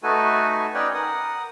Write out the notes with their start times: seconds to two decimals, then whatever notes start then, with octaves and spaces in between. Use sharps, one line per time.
0.03 A3 D#4 F#4 A4 B4 G#5
0.74 C#4 D#4 B4 C#5 D5 G5
0.94 A#4 F#5 D#6